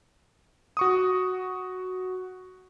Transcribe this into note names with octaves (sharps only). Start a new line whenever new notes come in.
F#4 C#6 D#6